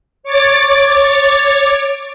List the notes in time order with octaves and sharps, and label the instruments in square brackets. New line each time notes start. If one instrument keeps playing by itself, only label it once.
[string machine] C#5 D6 A6